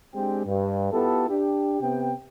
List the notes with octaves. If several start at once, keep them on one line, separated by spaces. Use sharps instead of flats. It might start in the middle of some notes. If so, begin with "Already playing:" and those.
G#3 C4 D4 G4 G5
G2
B3 E4 F4 G4 A4
D4 G4
C3 B3 G5